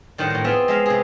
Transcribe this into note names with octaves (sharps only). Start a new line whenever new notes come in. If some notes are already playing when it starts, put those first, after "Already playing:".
A2 D#3 G3 C5 F#5 A5
A2 A#3
B3 C4 F4 G#4 E5
G#3 E5 F5
C3 G#4